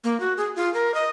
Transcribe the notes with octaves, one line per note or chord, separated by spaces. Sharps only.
A#3
F#4
G#4
F4
A#4
D#5